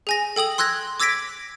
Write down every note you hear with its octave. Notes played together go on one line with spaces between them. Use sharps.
G#4 G#5 A#6
A4 G5 D#6 F#7
C6 E6 F#6 G#6 A#6
D6 E6 G#6 A#6 B6 D7